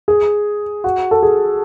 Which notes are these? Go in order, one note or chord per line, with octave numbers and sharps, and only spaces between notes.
G#4
F#4
A4
G#4